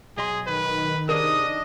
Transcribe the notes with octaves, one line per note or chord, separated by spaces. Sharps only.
B1 G#4 D#5 C6
D#3 B4
C3 D4 G#4 A#4 D#5 D#6